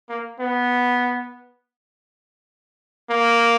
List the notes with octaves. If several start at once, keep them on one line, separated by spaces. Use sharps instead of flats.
A#3
B3
A#3